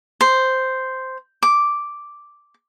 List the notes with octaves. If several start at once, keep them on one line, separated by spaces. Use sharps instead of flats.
C5
D6